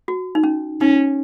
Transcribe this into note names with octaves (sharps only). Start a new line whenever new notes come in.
F#4
D#4
C#4
C#4 D#4